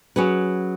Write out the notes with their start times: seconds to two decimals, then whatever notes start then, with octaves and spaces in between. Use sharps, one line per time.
0.16 F#3 C#4 G#4 B4